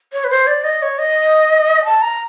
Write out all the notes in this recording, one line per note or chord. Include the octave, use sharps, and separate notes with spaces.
C#5
B4
C5
D5
D#5
C#5
D#5
A5
A#5